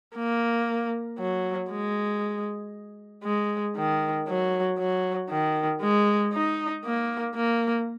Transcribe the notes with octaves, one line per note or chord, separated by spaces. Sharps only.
A#3
F#3
G#3
G#3
D#3
F#3
F#3
D#3
G#3
D#4
A#3
A#3